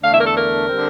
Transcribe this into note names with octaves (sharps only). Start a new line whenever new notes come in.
E2 D3 A3 D4 F5
E5
A#4
A4
A#4
D3 G3 C4